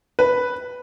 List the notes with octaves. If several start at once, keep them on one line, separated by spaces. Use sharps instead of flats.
B4